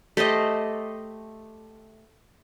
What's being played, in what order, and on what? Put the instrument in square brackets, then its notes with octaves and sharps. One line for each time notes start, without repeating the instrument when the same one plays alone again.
[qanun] A3 G4 C5 D#5